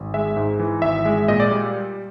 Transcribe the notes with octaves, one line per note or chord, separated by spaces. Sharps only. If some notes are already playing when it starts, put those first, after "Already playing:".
Already playing: G#1
G#3 E5
G#2
E3
G#1 E5
G#3
A#2 D#5
D5
G3